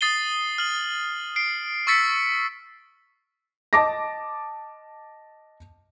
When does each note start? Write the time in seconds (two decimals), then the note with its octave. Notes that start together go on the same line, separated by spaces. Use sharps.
0.01 D#6 A6 C7 D#7 G7
0.58 F6 F#7
1.36 C7 D7
1.87 C#6 E6 A6 B6 C#7
3.73 D#5 A5 D6 A#6